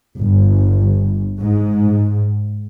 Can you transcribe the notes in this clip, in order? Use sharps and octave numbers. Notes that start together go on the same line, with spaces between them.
G1
G#2